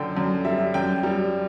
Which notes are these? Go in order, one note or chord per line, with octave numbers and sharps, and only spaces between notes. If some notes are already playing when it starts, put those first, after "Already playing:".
Already playing: F#2 D3 G5
F#2
G3 E5
F#2 G5
G3